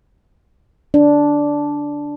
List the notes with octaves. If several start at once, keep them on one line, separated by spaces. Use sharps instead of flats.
D4